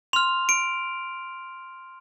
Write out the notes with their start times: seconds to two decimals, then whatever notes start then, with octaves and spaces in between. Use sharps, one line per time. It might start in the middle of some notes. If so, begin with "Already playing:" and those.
0.13 C6 F6 F7
0.49 D7